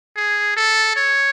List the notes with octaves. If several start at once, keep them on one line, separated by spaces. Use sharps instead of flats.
G#4
A4
C#5